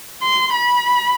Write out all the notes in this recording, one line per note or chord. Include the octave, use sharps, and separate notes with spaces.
C6
B5